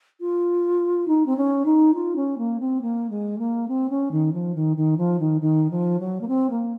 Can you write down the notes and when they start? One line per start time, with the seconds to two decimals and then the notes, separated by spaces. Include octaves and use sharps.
0.20 F4
1.08 D#4
1.26 C4
1.37 C#4
1.65 D#4
1.94 F4
2.16 C#4
2.38 A#3
2.60 C4
2.81 A#3
3.10 G#3
3.38 A#3
3.68 C4
3.90 C#4
4.11 D#3
4.33 F3
4.55 D#3
4.77 D#3
4.97 F3
5.19 D#3
5.41 D#3
5.71 F3
5.99 F#3
6.21 A#3
6.28 C4
6.50 A#3